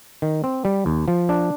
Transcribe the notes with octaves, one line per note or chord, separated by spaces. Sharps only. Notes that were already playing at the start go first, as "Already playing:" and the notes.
D#3
C4
G3
D#2
F3
D4